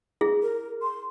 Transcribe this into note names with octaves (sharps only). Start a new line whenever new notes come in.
E4 G#4
A#4
C6